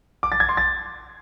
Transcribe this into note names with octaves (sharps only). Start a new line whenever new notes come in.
D6
A6
G#6
C6
A6